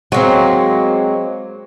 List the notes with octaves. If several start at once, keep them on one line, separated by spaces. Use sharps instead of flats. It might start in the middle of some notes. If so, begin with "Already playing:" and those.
F#3 G#3 A#3 C4